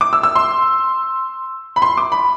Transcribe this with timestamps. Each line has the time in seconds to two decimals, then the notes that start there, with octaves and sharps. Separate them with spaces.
0.01 D6
0.13 E6
0.23 E6
0.36 C6
1.76 B5
1.82 C6
1.97 D6
2.12 B5